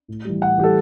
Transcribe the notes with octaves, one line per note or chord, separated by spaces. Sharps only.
A2
E3 G3
A2 F#5
E3 G3 G4 A4